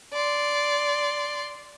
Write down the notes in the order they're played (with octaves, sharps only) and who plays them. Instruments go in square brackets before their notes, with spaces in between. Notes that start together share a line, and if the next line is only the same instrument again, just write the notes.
[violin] D5 C6